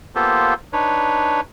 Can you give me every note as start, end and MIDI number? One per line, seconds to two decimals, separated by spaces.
0.15 0.54 58
0.15 0.54 59
0.15 0.54 65
0.15 0.54 67
0.15 0.54 69
0.15 0.54 72
0.73 1.41 62
0.73 1.41 63
0.73 1.41 71
0.73 1.41 73